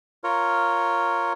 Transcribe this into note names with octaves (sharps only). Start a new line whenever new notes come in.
F4 A#4 C#5